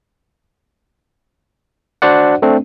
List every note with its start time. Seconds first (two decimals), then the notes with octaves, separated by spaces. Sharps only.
2.02 D4 F#4 C5 D5 F#5
2.42 A3 C4 D4